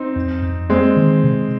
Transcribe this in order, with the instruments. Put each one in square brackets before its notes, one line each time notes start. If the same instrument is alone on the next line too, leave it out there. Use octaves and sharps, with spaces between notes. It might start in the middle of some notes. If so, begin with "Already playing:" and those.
Already playing: [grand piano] C4 D#4
[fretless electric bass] F2
F2
[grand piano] G#3 C4 [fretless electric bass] A#3
[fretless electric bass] D#3
C3